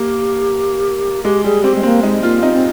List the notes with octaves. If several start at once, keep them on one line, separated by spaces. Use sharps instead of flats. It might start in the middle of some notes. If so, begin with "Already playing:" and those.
Already playing: A#3 G4
G#3 G4
G3 G#4
C4 G4
G#3
A#3 C4
G#3 D#4
A#3 F4
C4 D#4
C4